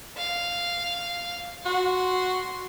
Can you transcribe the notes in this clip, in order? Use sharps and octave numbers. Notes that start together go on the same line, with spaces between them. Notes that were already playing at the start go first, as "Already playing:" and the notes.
F5
F#4 C6